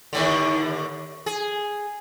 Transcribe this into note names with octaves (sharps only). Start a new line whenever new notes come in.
D#2 A2 D3
G#4